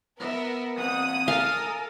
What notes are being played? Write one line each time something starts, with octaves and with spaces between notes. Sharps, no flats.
B3 A#4 E5
E3 C4 F#5 D#6
A4 A#4 F5 G#5